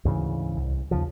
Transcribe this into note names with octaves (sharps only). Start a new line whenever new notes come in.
D2 G#2 C#3 E3
C2
D#2 C#3 F3